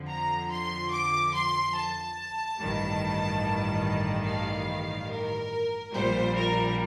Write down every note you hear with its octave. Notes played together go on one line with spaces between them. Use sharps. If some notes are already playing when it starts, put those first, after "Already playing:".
Already playing: F2 D3 F3
A#5
C6
D6
C6
A5
A1 G2 D#3 G3
F5
A#4
A#1 A#2 G3 C5
A#4